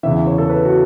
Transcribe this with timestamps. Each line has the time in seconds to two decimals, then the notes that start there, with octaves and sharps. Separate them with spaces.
0.03 E2 C#3 E3 E5
0.27 C#5
0.38 A4
0.49 B4
0.65 F#4